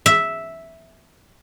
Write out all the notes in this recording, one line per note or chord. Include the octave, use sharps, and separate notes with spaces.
E5